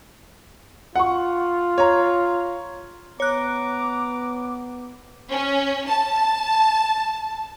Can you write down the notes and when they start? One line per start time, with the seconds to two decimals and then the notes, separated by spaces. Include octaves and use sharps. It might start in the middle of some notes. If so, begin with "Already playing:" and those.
0.96 F4 F#5 C#6
1.78 C#5 A#5
3.20 B3 C#5 A#5 D6 F#6
5.31 C#4
5.89 A5